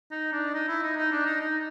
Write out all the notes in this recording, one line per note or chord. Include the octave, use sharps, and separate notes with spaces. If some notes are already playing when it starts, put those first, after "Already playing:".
D#4
D4
D#4
E4
D#4
D#4
D4
D#4
D#4